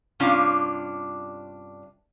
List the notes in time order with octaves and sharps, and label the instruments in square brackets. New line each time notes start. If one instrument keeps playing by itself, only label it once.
[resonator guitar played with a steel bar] G2 C3 C#4 D4 F4